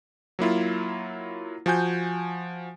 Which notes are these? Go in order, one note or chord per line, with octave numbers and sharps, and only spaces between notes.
F#3 A#3 E4 F4
F3 F#4 G#5 G6